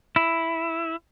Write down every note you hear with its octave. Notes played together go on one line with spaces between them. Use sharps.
E4